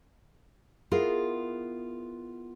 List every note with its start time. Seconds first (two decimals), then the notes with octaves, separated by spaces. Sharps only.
0.91 B3 E4 F4 G#4 A#4